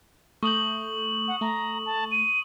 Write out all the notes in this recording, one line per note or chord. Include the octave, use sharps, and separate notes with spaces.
A3 C#6 D#6 G6 F#7
F#5
A3 A#5
A5
D#7